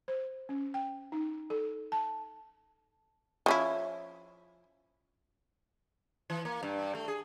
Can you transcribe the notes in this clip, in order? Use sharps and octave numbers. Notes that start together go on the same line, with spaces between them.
C5
C#4
G5
D#4
A4
A5
F3 C#4 E4
E3
A#3
G2
A3
G#4